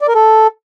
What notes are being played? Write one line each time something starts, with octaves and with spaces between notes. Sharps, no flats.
D5
A#4
A4